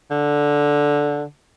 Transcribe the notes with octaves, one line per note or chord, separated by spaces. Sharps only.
D3